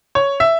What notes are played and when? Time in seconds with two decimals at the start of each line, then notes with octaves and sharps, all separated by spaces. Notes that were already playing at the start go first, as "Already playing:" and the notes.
0.15 C#5
0.40 E5